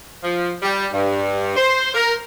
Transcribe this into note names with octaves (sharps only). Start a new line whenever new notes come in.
F3
G3
G2
C5
A#4